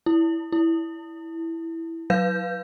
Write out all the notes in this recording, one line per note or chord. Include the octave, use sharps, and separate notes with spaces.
E4
E4
F#3 B4 F5 G6